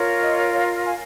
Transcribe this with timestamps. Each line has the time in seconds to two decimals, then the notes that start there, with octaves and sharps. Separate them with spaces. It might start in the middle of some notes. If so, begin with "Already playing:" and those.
Already playing: F4 A#4 C#5
0.23 D#5
0.53 C#5 F5
0.84 F5 G#5